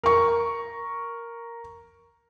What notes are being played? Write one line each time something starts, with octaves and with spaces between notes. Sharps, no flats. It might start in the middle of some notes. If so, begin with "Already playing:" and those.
A#4 C#6